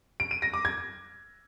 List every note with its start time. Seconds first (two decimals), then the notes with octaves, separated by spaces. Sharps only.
0.20 D7
0.31 D#7
0.42 A#6
0.54 D6
0.65 G#6